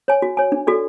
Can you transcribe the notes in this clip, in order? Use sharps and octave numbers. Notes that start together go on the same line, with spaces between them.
C#5 G#5
F#4
C#5 G#5
D4
F#4 A4 D5